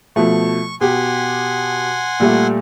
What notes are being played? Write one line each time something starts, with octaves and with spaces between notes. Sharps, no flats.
B2 F3 A3 C#6
B2 G4 F#5 G#5 C6
A#2 G3 A3